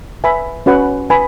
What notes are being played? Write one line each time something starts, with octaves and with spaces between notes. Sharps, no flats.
B4 E5 G#5 B5
C#4 F#4 B4 F#5
B4 G#5 B5